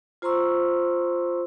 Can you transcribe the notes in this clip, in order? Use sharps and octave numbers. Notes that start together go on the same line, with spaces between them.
F4 C5 A#5 C6 C#6 E6